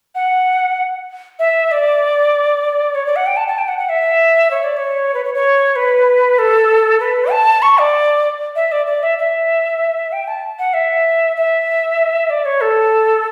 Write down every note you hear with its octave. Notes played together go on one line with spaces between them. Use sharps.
F#5
E5
D5
C#5
D5
F#5
G5
A5
A5
G5
F#5
F#5
E5
C#5
D5
C#5
B4
C#5
C#5
B4
A4
B4
A5
C#6
D5
E5
D5
D5
E5
E5
G5
A5
F#5
E5
E5
D5
C#5
A4